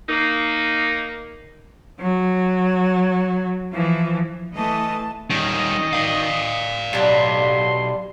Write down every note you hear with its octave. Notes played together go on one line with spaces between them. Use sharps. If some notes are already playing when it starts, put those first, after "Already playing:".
A#3 D#4
F#3
E3 F3
E3 A3 D#5 A5
D#3 G3 C#4 D#5
D5 F5
B1 G3 D4 C6